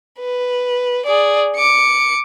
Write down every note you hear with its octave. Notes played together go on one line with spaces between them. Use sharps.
B4
G#4 D5
D6 C#7